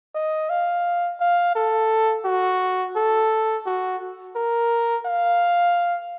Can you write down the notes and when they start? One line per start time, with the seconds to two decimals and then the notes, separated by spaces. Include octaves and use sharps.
0.15 D#5
0.50 F5
1.20 F5
1.55 A4
2.25 F#4
2.96 A4
3.66 F#4
4.36 A#4
5.06 F5